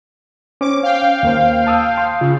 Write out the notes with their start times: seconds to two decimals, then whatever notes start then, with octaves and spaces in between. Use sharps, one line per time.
0.61 C#4 C5 D6
0.83 F5 G5
1.23 D#2 A#3 C5
1.67 A5 D#6 E6
1.98 C6
2.21 C#3 F4